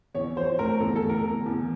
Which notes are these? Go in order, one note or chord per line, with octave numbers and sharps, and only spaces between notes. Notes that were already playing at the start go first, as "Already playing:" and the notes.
E2 C#5
F3 C5
A3 A#4
E2 A4
A4
A3
A#4
E2
E2